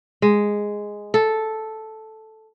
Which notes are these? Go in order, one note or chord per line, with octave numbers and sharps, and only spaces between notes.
G#3
A4